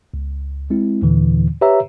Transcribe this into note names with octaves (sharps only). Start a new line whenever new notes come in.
C#2
G#3 C4 E4
D#2 A#2 D3 E3
G4 B4 C#5 E5 A#5 E6